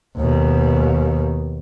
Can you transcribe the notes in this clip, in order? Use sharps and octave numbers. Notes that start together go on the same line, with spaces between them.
D#2 B2